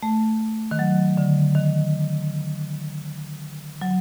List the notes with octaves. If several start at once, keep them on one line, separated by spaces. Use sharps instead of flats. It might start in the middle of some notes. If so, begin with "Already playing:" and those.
A3
D#3
F#3
D3
D#3
F#3